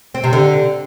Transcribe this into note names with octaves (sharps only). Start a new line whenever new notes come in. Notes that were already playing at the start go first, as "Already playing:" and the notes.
C4
C3
D3